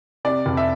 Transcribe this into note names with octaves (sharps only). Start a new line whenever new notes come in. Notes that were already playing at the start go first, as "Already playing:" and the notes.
C3 D5
F1
E5